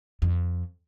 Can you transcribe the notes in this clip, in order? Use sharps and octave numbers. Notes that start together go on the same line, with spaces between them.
F2